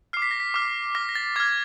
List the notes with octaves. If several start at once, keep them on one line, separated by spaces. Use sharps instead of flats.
D6 F6 C7
B6
A#6
B6
D6 F6
D6 F6 A#6
A#6
A6
D6 F6 G#6